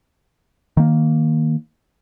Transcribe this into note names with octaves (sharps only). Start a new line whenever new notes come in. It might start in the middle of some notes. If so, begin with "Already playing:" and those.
D#3 A#3